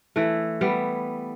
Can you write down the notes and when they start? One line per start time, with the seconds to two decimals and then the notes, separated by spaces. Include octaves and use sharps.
0.16 E3 A3
0.61 G3 B3